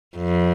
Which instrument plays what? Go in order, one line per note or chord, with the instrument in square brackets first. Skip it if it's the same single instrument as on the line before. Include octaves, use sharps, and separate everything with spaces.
[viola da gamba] F2